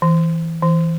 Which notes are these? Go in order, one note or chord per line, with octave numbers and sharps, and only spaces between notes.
E3
E3